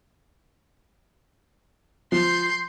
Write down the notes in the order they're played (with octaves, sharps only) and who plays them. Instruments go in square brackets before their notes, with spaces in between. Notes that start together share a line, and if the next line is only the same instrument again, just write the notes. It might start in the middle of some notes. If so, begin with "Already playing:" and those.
[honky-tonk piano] F3 [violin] C6 G6